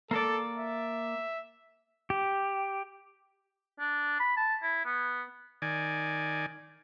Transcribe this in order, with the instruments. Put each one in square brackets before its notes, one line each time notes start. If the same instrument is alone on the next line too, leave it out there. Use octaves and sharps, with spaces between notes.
[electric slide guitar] A#3 D5 [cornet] A4
[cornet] E5
[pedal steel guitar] G4
[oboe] D4
B5
A5
E4
B3
[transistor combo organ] D#3 D5 G#5